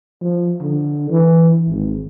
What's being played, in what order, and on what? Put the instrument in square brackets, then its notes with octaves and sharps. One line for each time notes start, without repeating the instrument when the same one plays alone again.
[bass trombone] F3
D3
E3
G#1